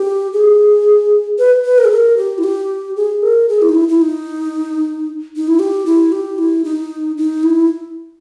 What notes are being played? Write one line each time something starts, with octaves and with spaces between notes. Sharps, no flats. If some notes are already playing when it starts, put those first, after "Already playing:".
Already playing: G4
G#4
B4
B4
A#4
G#4
A#4
G4
E4
G4
G#4
A#4
G#4
E4
D#4
E4
E4
D#4
D#4
E4
G4
E4
G4
E4
D#4
D#4
E4